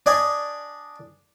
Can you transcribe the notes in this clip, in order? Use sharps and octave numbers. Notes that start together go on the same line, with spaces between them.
D4 D5 D#5 G#5